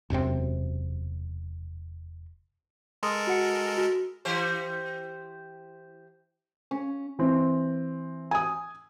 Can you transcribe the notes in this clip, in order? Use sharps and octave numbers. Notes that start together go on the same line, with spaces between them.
E1 F#2 C3 C4
G#3 A4 A#4 C6 D#6
F#4 F#5 C#7
F#4
E3 G4 C5
C#4
E3 C4
G#5 D#6